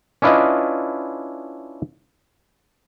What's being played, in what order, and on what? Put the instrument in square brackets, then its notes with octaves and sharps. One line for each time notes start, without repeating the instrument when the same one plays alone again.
[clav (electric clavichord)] C#4 D4 E4 F4 B4 D#5